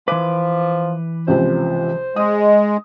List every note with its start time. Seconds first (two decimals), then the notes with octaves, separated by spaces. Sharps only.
0.08 E3 F3 B4 D6
1.28 C#2 C3 F3 C5
2.16 G#3 D#6